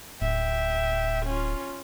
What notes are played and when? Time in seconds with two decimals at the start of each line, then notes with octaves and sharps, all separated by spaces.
0.22 D1 E5 G5
1.26 C#4 F4